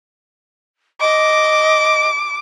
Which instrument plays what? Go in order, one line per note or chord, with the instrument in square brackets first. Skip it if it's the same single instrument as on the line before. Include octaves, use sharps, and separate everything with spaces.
[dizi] D#5 [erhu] D6